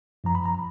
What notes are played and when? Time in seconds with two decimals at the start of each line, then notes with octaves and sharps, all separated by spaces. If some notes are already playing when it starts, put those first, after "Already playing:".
0.24 F#2 F3 A#5
0.35 B5
0.45 A#5